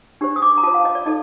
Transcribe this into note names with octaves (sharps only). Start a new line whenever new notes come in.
D4 G4 C5
D#6
D6
A#5
F4 C5 A5
F5
D#5
D5
D#4 A4 D#5